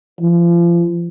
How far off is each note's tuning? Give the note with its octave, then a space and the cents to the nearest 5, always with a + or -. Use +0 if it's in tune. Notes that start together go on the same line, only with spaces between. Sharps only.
F3 -35